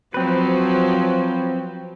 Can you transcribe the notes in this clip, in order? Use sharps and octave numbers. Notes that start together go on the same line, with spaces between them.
F3 F#3 C4 B4